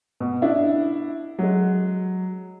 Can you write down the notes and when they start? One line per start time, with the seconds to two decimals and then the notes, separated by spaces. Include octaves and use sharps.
0.20 B2
0.42 D4 E4
1.39 F#3 G#3